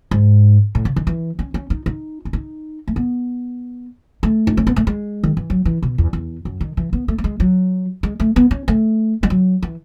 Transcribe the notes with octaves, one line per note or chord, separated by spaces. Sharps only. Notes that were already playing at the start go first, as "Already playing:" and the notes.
G#2
A2
C#3
D#3
E3
C#4
C#4
D#4
D#4
C#4
D#4
A3
B3
A3
D#4
C#4
B3
A3
G#3
D#3
E3
F#3
E3
B2
E2
E2
F#2
D#3
E3
B3
A3
A3
G#3
F#3
G#3
A3
B3
C#4
A3
G#3
F#3
E3